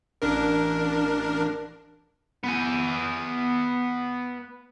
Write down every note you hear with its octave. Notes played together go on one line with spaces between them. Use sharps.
A1 D4 A#4
B3 G#5